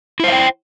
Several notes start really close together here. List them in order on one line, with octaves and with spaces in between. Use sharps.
E4 C5 F5 G5